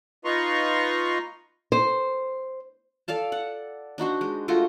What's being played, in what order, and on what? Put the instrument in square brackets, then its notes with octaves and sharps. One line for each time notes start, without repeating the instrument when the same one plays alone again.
[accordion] D#4 F4 B4 A#5 C6 C#6
[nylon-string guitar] C5
[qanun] A4 D5 F5 A5
D5 F#5
D4 D#4 F#4 C5
G#3
G#3 A3 F4 F#4